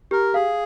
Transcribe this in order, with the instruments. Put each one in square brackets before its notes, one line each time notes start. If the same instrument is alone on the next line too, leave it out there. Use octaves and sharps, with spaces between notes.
[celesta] G4 [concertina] A#4
[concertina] G#4 [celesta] F5